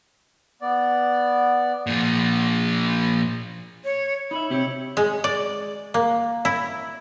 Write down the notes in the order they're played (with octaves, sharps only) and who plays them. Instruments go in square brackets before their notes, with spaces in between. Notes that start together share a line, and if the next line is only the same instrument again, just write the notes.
[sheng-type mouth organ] B3 D5
[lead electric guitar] A#2 F3
[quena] C#5
[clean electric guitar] D#4 E5 [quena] B5
[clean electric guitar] C3 C4 G4 [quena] C#5
[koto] G#3
D5
A#3
E4